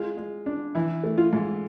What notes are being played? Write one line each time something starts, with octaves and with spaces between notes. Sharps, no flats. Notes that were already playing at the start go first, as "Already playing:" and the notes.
Already playing: G#3 F4
G#3
D4
E3 E4
A3
F4
G#2